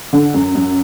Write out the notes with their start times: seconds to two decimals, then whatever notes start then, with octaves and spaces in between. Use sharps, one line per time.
0.13 D3
0.34 F#2
0.55 F#2